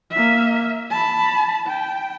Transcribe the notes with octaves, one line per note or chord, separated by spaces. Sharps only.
A#3 E5
A5 B5
G5